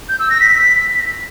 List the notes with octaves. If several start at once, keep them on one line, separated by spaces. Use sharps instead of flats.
G6
E6
A#6
B6